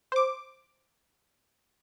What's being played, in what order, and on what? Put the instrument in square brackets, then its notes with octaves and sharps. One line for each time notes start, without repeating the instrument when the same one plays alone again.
[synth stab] C5 D6